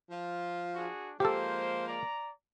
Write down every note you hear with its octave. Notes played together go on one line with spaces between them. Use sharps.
F3 F4
D4 F#4 G#4
F3 G#3 A#3 G4 A4 C5
D5 A#5